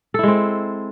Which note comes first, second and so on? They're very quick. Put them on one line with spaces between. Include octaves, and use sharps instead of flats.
A4 E4 G#3 C4